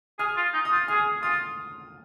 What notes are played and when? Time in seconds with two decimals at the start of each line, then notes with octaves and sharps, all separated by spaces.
0.19 G#4 F6
0.36 F4
0.53 D#4
0.65 D#6
0.71 F4
0.88 G#4 F6
1.22 F4 D#6